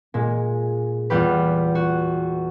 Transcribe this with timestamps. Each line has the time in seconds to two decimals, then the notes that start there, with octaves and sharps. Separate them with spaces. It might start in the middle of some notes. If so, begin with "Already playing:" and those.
0.14 A#2 G#3
1.10 E2 G3 F4 G4 B4
1.75 F#4